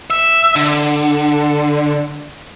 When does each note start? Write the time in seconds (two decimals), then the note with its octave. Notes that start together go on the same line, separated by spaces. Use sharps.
0.10 E5
0.56 D3